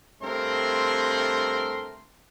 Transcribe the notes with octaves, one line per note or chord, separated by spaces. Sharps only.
G2 A3 C4 A#4 C6